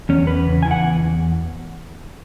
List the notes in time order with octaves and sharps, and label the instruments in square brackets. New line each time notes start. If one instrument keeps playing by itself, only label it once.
[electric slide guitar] E2 C#4
E2 B4
C#3
E3 G#5
F#5
E2
E2